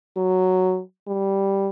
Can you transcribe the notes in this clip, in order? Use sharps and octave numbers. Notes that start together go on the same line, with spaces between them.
F#3
G3